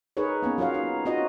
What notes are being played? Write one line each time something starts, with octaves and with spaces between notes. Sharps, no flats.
D#4 G#4 A#4 B4 C#5
A#3 B3 C#4
F#3 F4 A#4 C#5 F5
D#4
C4 D#4 F4 F#4 D#5